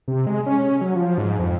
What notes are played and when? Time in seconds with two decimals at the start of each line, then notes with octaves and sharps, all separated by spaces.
0.08 C3
0.27 G#3
0.46 C#4
0.81 F#3
0.96 F3
1.18 G#2
1.40 F2